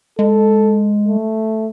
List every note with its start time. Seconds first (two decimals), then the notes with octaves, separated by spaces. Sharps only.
0.19 G#3 A4
1.09 A3